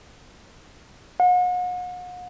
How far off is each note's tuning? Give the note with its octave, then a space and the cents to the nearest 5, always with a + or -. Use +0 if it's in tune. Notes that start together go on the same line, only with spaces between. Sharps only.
F#5 -40